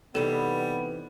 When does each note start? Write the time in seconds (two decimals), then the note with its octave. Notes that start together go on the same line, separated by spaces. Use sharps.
0.15 C3 E3 G3 B3 D#4 A4 E7